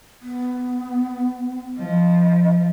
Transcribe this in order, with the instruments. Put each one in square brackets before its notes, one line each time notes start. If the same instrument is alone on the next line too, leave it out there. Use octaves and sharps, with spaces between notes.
[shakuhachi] B3
[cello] F3 [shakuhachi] D#5